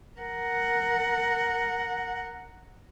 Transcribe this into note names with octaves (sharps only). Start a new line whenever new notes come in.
A#4 F#5